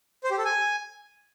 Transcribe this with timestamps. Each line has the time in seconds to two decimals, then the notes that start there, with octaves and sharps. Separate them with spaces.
0.24 C5
0.31 G4
0.38 A4
0.45 G#5